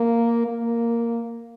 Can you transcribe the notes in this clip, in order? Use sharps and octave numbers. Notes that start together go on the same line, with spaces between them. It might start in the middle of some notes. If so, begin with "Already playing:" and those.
Already playing: A#3
A#3